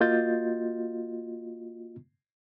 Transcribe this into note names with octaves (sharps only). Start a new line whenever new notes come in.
A#3 F4 F#4 D#5 G6 A6